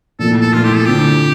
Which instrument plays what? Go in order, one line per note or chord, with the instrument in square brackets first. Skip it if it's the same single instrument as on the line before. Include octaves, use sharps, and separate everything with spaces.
[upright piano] A#2 F3 A3 E4 [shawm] A4
[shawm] A4
[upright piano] A#2 F3 A3 E4 [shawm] F4
[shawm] G4
A4
[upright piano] D3 A3 C4 F4 [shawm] G4